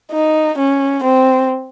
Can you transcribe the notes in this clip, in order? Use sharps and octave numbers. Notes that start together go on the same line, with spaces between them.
D#4
C#4
C4